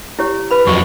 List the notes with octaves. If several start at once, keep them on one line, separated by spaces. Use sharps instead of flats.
E4 G4 C#5
B4 B5
F2 F#3 C#6